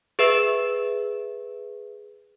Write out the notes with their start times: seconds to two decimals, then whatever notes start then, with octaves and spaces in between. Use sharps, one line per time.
0.19 G#4 B4 E5 E6